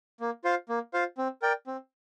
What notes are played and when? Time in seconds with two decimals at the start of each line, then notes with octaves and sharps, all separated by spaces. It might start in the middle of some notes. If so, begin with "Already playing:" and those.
0.20 A#3
0.44 F4 C5 F5
0.69 A#3
0.94 F4 C5 F5
1.18 C4
1.42 A#4 D5 G5
1.67 C4